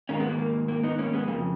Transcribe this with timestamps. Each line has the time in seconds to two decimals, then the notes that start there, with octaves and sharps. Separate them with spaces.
0.09 G#2 D#3 A#3 C#4
0.20 G#3 B3
0.29 A#3
0.39 A#3
0.68 A#3
0.83 B3 D#4
0.98 A#3 C#4
1.13 G#3 B3
1.28 F2 C#3 A#3